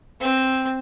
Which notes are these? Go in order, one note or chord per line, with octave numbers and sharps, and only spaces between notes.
C4